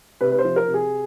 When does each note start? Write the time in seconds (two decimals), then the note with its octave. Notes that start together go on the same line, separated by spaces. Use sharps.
0.21 C3 B4
0.32 B4
0.39 C5
0.45 F3
0.56 A#4
0.68 C3
0.74 G#4